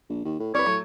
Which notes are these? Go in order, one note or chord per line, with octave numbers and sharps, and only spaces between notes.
A#1
D#2
A2
C2 B4 C#5 D5
A2 F#3 A3